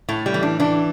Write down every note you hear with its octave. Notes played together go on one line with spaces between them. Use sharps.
A2 A3
G3
E3
D4
E3 D4